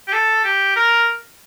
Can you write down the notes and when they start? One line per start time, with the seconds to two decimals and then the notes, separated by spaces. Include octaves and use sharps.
0.08 G4
0.13 A4
0.44 G4
0.76 A#4